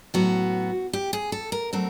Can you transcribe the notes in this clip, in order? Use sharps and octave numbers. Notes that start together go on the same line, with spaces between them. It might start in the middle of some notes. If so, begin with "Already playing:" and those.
A2 F#3 B3 F#4
G4
G#4
A4
A#4
F#3 A3 C4 A#4